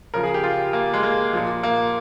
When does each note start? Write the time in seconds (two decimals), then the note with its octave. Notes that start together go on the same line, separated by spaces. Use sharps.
0.14 C#3 F3 A#4
0.23 G#4
0.34 G4
0.44 F4
0.73 A#3
0.93 G#3
1.03 A#3
1.33 A#2 F3
1.63 A#3